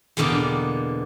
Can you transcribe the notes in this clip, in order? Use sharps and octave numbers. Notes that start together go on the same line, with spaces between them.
E2 B2 D3 A#3 G5